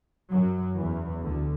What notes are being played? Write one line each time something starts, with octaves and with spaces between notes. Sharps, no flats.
F#2 F#3
E2 E3
D2 D3